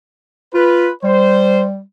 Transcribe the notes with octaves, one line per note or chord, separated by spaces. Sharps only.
F4 B4
G3 C5